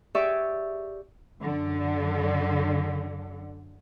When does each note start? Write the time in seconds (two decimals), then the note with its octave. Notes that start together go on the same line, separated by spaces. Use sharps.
0.15 G4 G#4 C#5 D5 E5 C#6
1.41 F#2 D3